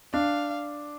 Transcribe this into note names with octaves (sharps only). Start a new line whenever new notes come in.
D4 F5